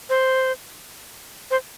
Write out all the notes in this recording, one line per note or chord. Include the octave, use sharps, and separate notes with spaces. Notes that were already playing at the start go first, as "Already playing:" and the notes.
C5
C5